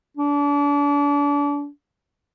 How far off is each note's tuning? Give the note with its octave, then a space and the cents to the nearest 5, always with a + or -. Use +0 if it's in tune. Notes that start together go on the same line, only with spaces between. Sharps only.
D4 -35